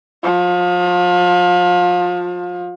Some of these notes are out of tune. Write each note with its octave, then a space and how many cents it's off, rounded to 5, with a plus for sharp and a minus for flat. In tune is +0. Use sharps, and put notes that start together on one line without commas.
F3 +30